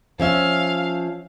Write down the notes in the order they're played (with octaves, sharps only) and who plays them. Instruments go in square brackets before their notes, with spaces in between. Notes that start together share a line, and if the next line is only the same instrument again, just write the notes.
[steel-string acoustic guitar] F3 C#4 E5 [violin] F5